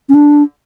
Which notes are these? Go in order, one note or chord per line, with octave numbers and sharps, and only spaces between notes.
C#4
D4